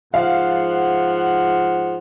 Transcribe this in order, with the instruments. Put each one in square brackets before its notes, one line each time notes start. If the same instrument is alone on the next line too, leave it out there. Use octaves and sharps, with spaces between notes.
[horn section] G#2 F3 F#5 [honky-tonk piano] F5